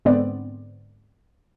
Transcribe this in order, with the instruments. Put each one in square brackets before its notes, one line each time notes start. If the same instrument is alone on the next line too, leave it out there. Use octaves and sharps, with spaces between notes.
[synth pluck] G#2 D3 B3 C4 D5